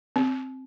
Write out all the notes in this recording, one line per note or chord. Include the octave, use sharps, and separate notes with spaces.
C4